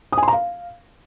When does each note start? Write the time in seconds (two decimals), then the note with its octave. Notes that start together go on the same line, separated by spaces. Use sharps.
0.12 D#6
0.18 G#5
0.23 C6
0.28 A#5
0.33 F5